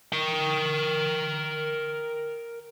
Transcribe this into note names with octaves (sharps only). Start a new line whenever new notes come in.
A#4 G5